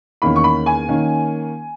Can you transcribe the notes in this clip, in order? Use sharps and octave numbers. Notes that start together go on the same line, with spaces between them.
E2 D#3 A#3 C#4 B5
C#6
B5
G#5
D#3 A#3 C#4